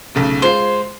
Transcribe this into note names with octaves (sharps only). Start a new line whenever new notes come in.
B1 C#3 A3
G#3 F4 C5 C7